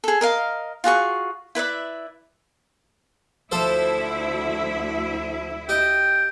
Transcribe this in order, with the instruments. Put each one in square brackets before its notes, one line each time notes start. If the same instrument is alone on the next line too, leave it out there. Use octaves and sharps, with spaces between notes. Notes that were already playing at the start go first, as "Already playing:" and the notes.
[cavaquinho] G#4 A4
A#4 D#5 F5
F4 F#4 G#4 C#6
E4 B4 D5 E5
[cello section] D2 E4 E5 [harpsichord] F3 A4 C5
[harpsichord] G4 D#5 [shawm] G5